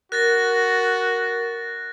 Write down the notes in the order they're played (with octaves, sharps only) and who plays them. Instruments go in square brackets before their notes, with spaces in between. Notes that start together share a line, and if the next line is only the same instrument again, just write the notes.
[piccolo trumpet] F#4 [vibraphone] A#4 [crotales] F#6 A6 A#6